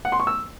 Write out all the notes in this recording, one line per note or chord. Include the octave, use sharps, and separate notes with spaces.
F#5
C6
C#6
E6